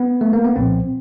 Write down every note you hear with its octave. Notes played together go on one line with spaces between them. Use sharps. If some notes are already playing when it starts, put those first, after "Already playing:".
Already playing: B3
A3
A#3
B3
C2 A#2 F3 C4